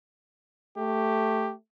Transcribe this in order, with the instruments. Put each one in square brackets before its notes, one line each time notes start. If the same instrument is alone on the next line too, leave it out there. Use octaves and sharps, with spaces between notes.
[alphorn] A3 [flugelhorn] G4